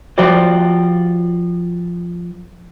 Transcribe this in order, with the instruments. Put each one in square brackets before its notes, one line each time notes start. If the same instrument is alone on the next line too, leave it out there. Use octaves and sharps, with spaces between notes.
[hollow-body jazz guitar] F3 F#4 G4 C5 D5